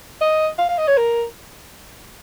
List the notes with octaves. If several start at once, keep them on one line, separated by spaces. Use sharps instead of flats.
D#5
F5
F5
D#5
C#5
A#4